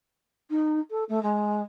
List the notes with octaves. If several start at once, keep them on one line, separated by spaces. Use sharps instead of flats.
D#4
A4
A3
G#3